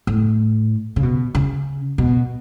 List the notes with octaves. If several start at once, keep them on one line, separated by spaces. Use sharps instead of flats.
A2
C#3
B2
C#3
B2